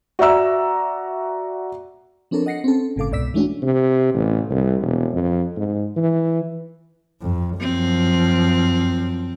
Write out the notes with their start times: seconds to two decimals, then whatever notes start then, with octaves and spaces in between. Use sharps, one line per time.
0.19 F#4 D5 E5 A#5 E6
2.31 F3 C4 D4 A4 A#4 C#5
2.46 D#5 F#5 A#6 C7 C#7
2.64 C4 C#4 A4
2.96 G1 A2 C#3 A4 F5 D6
3.11 C2 G#2 B2 D5 E6 B6
3.34 E3 G#3 A3 C#4 D4 F#4
3.62 C3
4.14 A1
4.50 C2
4.82 E1
5.13 F2
5.57 G#2
5.97 E3
7.22 F2
7.60 F#2 F3 C4